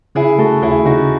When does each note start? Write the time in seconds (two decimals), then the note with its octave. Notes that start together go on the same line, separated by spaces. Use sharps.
0.15 C#3 E4 G#4
0.38 A3 F#4 A4
0.62 D#2 E4 G#4
0.85 C#3 D#4 F#4